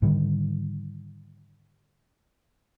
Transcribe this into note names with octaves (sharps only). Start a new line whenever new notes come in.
G#2 D3 D#3 G3